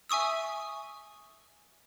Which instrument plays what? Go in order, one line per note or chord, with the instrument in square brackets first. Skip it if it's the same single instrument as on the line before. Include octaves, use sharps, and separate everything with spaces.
[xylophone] E5 G#5 C#6 D#6 E6